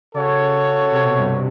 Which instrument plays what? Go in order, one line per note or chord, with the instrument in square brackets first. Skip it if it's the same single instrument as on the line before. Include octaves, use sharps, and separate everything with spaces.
[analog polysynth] C#3 [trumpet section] F#4 A4 C#5
[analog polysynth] C3
B2
G2